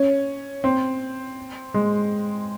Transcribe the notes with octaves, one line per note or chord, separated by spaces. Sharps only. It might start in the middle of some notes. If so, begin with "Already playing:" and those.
Already playing: C#4
C4
G#3